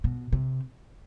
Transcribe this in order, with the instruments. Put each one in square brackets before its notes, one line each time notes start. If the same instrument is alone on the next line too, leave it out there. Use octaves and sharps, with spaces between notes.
[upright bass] B2
C3